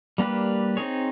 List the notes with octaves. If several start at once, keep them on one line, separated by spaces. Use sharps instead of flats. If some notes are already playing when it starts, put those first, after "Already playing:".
G3 A#3 D4 G4 B4
C4 D#4 G#4 C#5